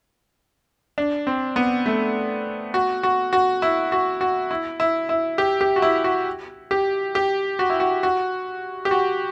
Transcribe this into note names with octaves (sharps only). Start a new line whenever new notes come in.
D4
C4
B3
A3
F#4
F#4
F#4
E4
F#4
F#4
E4
E4
E4
G4
G4
F#4
E4
F#4
G4
G4
F#4
E4
F#4
F#4
G4
F#4